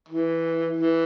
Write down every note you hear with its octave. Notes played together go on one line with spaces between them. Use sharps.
E3
E3